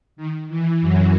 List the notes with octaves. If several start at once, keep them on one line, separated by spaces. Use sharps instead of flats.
D#3
E3
F#2 F#3